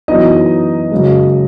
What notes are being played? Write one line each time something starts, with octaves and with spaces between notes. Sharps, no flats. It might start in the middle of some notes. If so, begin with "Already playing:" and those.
F#2 E3 B3 D#4 D#5
F#2 C#3 G#3